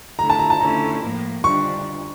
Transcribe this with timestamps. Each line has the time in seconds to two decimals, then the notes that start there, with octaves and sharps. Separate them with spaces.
0.19 D3 A3 E4 A#5
0.30 A5
0.39 A#5
0.50 A5
0.61 D3 A3 C#4 E4 A#5
1.02 A2 F3 A#3
1.44 D3 G3 D4 C#6